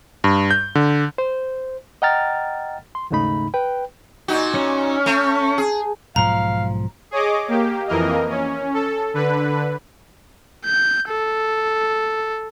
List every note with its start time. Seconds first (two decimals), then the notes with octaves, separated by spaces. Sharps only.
0.24 G2
0.51 G6
0.75 D3
1.18 C5
2.02 D#5 F#5 G5 A#5 F6 A6
2.95 C6
3.11 D#2 G#2 C#3 A3 D#4 B5
3.54 B4 G5
4.28 A#2 D#4 F#4
4.54 C#4
5.06 A3
5.58 G#4
6.16 B1 G#2 F3 F5 A#5
7.11 G#4 C#5 D#5 D6
7.48 A#3 G4
7.88 F2 E3 A#3 A#4 D#5
8.30 C#4
8.74 A4
9.14 D3 B4
10.65 G6
11.09 A4